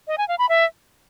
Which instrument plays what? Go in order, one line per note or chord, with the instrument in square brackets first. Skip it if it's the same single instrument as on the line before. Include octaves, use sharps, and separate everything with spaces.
[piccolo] D#5
G#5
F5
B5
E5